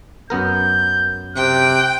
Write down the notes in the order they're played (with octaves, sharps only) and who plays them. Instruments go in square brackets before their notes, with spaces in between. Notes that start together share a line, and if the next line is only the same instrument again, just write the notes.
[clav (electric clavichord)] F#2 B3 A#4 [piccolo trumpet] G6
[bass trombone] C3 [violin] G5 [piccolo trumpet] F#6